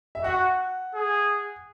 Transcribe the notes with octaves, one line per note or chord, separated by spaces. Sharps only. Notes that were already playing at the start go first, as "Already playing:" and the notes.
E5
F#4 F#5
G#4